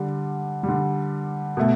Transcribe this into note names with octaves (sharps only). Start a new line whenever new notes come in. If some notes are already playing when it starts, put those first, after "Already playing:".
Already playing: D3 G3
G3
D3
B2 A3